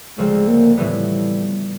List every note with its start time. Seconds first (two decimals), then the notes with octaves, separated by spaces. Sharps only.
0.18 D2 C#3 F3 G#3 A3 C4
0.48 A#3
0.77 A2 E3 G3 B3